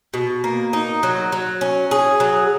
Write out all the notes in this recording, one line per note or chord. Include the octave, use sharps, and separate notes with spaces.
B2
A#3
D#4
F#3
F#3
C#4
G#4
F#3